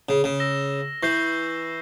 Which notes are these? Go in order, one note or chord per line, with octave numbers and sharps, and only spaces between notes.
C#3
C#3
E6 A#6 E7 G7
E3 C#6 G6 C7